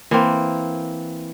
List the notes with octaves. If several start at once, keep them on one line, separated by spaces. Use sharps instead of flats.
E3 A#3 C4